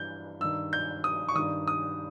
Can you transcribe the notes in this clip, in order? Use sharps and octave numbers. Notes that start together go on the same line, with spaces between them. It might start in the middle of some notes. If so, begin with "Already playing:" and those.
Already playing: G2 E3 G6
G2 D#3 E6
G6
D#6
C#6
G2 D#3 D#6
D#6